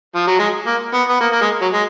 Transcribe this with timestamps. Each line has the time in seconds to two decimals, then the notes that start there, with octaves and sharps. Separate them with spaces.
0.15 F3
0.27 F#3
0.39 G#3
0.67 A#3
0.94 B3
1.09 B3
1.21 A#3
1.32 A#3
1.41 G#3
1.61 F#3
1.73 G#3